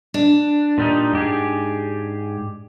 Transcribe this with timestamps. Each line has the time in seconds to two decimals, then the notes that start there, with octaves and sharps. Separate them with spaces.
0.14 D4
0.78 A#2 G3 D#4
1.13 G#2 G4 G#4